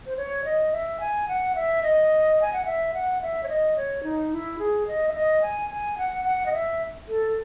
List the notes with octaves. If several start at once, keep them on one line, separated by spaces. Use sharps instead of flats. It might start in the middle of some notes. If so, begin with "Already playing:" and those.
C5
C#5
D#5
E5
G#5
F#5
E5
D#5
G#5
F#5
E5
F#5
E5
C#5
D#5
C#5
D#4
E4
G#4
D#5
E5
D#5
G#5
G#5
F#5
F#5
D#5
E5
A4